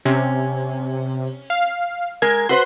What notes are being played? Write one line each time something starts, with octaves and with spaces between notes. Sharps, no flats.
C3 C#4
F5
G#3 A#4 G#6
F#4 B4 C5 C6